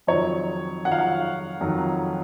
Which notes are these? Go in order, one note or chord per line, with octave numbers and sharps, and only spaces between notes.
F2 D#3 F#3 C#5
F2 D#3 F#3 F#5
F5
F#5
F2 D#3 F#3